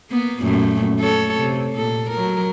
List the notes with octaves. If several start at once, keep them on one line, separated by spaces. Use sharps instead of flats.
A#3 B3
F#2 A#2 A3
A4 C#5
C3
A#2 A4
F#3 A#4